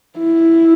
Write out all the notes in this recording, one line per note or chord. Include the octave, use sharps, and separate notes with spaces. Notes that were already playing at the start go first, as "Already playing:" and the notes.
E4